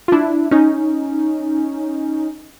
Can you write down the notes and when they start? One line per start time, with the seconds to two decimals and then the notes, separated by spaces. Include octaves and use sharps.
0.08 F4
0.12 D4 E4
0.51 C#4 D#4